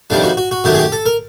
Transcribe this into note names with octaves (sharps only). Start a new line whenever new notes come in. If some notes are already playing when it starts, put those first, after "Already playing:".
F2 C3 D#3 G3 D4
F#4
F#4
F#4
F#2 D#3 F#3 A3 G4
G#4
G4
A4
A#4